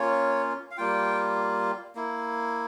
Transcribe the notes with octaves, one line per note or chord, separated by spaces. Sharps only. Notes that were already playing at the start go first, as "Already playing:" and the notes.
Already playing: A#3 C#4 F4 C#5
F5
G3 A#3 F4 G5
A#3 E4